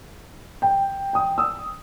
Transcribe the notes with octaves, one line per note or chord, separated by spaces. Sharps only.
G5
G5 D#6
D#6 E6